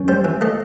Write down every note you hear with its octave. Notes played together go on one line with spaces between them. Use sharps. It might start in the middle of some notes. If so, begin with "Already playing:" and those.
Already playing: F#2
G3 C5
E3
A3 D#5